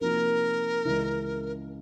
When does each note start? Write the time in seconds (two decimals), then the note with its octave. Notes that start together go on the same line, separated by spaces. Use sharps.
0.01 C3 F3 A#3 D#4 F#4 A#4
0.85 C#2 C#3 E3